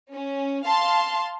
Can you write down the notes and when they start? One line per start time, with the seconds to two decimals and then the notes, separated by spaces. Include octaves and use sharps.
0.11 C#4
0.65 F5 A5 C6